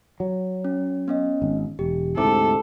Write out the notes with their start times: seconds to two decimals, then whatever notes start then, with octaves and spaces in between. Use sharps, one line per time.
0.20 F#3
0.64 C#4
1.08 B3 C#4 D#5
1.42 G#1
1.79 E1 G4
2.17 D2 G#2 C3 E4 A4 D6